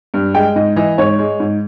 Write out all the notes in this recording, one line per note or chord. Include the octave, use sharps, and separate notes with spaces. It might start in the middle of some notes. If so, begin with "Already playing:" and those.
G2
G#3 G5
G#2 D#5
E3 D#5
G#2 C#5
G#3
G#2